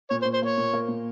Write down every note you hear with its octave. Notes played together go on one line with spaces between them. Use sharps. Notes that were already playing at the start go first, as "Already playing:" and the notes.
A#2 C#5
C5
A#2
C5
A#3 C#5
A#2
A#3
A#2